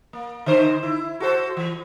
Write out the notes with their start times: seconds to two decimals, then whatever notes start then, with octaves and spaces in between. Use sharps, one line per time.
0.13 A#3
0.46 D3 D#3 C5
0.83 E4
1.20 F#4 A4 C5
1.57 E3